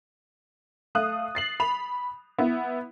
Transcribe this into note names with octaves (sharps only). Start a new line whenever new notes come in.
A3 F5 D#6 F#6
A6 C7 F#7
B5 F7
B3 E4